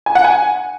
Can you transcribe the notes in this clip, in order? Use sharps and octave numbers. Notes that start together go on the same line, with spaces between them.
G#5
F#5
G#5